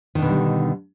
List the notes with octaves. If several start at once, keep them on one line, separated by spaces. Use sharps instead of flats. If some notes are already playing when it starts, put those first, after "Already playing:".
B2 D3 D#3 G3 D4